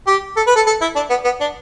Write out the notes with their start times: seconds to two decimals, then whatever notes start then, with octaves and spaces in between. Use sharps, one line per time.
0.07 G4
0.37 A4
0.47 B4
0.56 A4
0.66 A4
0.81 E4
0.96 D4
1.10 B3
1.25 B3
1.41 D4